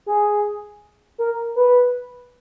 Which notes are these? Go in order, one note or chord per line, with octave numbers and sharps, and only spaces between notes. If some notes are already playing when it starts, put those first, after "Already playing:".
G#4
A#4
B4